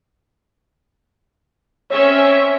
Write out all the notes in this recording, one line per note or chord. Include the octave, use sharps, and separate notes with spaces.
C4 C#4 C#5 E5